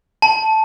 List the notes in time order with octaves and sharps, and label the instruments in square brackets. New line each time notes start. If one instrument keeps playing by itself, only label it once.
[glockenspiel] A5